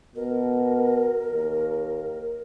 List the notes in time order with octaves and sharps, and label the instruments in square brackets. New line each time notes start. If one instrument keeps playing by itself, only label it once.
[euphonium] B2 [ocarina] A#4
[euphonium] D#2